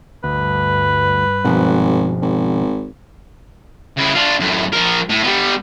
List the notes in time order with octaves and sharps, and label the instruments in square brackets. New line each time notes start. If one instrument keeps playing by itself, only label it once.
[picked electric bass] D2 [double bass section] G2 [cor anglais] B4
[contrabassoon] G#1 [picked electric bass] B2 F3
[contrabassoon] G#1
[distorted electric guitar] C#3 E4
D4 F4
F#2 A2
F3 A#4
A2
G3 B3